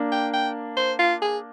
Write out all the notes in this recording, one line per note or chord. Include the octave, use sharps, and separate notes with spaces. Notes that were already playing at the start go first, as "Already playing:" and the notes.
Already playing: A#3 D4
G5
G5
C5
F4
G#4